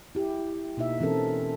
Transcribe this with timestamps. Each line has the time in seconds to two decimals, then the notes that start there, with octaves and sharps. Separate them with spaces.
0.15 E4 G4
0.77 B2 A#3 D#4 F4 E5
1.01 E3 C4 C#4 A4 A#4